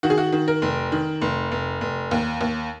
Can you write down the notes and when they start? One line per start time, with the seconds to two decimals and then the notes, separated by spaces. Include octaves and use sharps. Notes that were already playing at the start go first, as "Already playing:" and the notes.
0.03 D#3 F#4
0.10 G#4
0.18 F#4
0.32 D#3
0.48 A#4
0.62 F1
0.92 D#3
1.21 F1
1.52 F1
1.81 F1
2.11 D#2
2.41 D#2